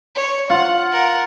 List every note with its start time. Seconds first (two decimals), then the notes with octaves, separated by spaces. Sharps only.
0.15 C#5
0.50 F4 F#5
0.92 A#4 F#5